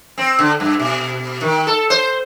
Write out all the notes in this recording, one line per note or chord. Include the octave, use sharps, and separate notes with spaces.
C4
D3
G2
B2
D#3
A4
C5